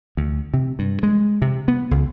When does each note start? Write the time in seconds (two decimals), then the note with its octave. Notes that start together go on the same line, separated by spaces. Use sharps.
0.17 D2
0.54 C3
0.79 G2
1.03 G#3
1.42 C3
1.68 B3
1.91 C#2